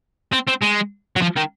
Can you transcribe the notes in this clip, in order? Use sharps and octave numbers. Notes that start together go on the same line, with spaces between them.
C4
C4
G#3
F#3
F3
D#3